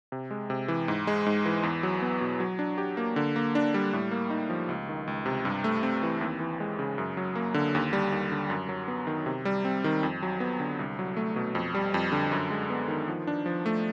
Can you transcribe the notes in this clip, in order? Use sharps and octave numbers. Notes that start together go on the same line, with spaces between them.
C3
G#3
C3
E3
G#2
G#3
G#2
E3
E2
F#3
B3
B2
F#3
D4
G4
A#3
D3
A#3
D4
G3
A2
A#3
D#4
F3
C#2
D#3
C#2
C3
G2
A3
C4
E3
D#2
E3
G#3
C#3
F#2
F#3
A#3
D3
D#2
G3
D#2
D3
F#2
F#3
B3
D#3
C3
G3
C4
D#3
F2
F#3
B3
D3
C2
F#3
A3
B2
F2
G3
F2
D3
F#2
G#3
B3
D#3
F3
D4
F3
A3